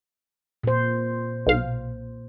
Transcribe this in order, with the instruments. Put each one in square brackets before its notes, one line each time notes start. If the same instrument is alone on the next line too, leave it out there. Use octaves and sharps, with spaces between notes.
[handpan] A#2 C5
[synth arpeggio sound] B1 F5